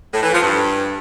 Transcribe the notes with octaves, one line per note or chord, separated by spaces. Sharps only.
A2
E3
F3
G2